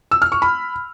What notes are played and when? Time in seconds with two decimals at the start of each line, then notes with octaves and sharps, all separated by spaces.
0.11 E6
0.22 F6
0.32 C#6
0.42 B5